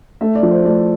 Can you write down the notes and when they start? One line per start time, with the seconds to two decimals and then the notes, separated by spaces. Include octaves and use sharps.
0.21 A3 E5
0.35 D5
0.43 F3
0.51 C5
0.65 A3 D5